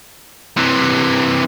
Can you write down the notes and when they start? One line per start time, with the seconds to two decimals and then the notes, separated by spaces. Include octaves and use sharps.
0.57 C3 E3